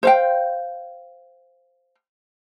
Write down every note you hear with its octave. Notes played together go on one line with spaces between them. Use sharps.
C5 F5 G5